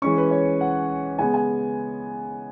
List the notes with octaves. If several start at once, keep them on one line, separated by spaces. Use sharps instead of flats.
E3 G#3 C#4 C#6
B4
C#5
F#5
C#3 G#3 B3 G#5
G#5